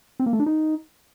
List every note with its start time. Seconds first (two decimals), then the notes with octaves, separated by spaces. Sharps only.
0.20 C4
0.26 A#3
0.33 A3
0.40 D4
0.46 D#4